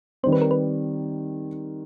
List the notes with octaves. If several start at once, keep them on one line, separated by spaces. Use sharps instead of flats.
D#3 G3 C4 C5
B4
A#4
B4